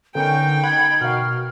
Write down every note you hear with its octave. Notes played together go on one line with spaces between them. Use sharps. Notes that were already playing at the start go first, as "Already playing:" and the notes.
D3 B3 C#4 D#4 A#4 G5 G6
F#5 B5 G#6
B2 F#4 A#4 F5 F6